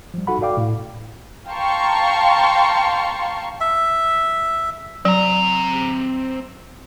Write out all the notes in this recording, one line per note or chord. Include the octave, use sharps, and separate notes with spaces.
F3 G3
D#4 F#4 A4 F#5 B5
F#4 A4 D5 F5 G5 D6
A2
F5 G5 A5 A#5 C6 C#6
E5
F#3 C4 A#5